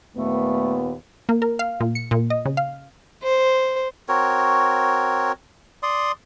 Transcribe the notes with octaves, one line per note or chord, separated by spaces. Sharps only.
D#2 A#2 A3 B3
A#3
A#4
F5
A#2
C#7
A#2
D#5
C#3
F5
C5
C4 F#4 A#4 C#5
D5 C6 D#6